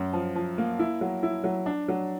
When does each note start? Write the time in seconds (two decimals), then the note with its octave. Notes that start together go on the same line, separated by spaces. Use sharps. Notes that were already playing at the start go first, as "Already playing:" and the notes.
Already playing: F#2
0.13 F3
0.36 F3
0.58 A#3
0.79 E4
1.01 F#3
1.23 E4
1.44 F#3
1.66 D4
1.88 F#3